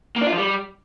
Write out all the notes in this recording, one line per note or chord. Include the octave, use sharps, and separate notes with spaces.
A#3
D4
F4
F3
G3